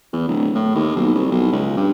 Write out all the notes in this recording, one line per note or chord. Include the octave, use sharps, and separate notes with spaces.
E2
D1
A2
D#2
B1
C2
B1
C#2
G2